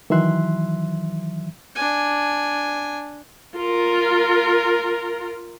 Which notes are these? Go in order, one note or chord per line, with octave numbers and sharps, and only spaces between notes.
D#3 E3 F#3 E5 C6 F#6
D4 G#5
F4 A#4